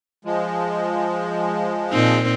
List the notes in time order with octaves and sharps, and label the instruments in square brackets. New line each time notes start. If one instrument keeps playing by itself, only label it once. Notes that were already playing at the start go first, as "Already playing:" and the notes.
[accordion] F3 G#3
[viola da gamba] A#2 C4 D#4